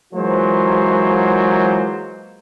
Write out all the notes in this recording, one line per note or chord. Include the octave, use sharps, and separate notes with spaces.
E3 F#3 G#3 A#3 F4 C5